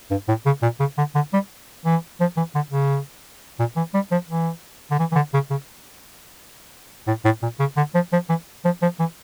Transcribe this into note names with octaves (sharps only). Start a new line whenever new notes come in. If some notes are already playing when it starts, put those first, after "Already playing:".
G2
A2
C#3
A#2
C#3
D3
D3
G3
E3
F3
E3
D3
C#3
A#2
E3
G3
F3
E3
D3
E3
E3
D3
C#3
C#3
A2
A2
A#2
C#3
D3
F3
F3
E3
F3
F3
E3